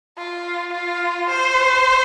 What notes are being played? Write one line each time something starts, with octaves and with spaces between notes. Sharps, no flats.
F4
F4
C5